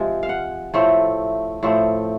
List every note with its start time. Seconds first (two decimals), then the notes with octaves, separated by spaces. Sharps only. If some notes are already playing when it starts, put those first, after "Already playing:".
Already playing: C3 F3 G#3
0.23 F5
0.29 F#5
0.74 A2 F3 A3 C4
1.63 A2 F3 A3 C4